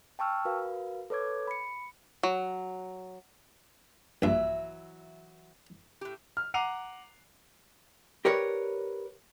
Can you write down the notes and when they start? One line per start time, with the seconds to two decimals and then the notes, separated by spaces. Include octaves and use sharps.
0.19 G5 A5 C#6 E6 F6
0.45 F#4 A#4 B4 F5
1.10 A4 B4 C#5 D6 G#6
1.47 B5 C#7
2.23 F#3
4.22 A#1 G2 E3 F#3 E5
6.01 A2 G4
6.37 F6
6.54 F#5 A#5 D6 C7 D#7 F7
8.25 G4 A#4 B4 C#5 D5